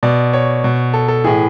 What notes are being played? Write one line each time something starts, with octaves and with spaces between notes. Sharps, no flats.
B2 D5
C#5
B2
A4
A4
A2 E3 G#4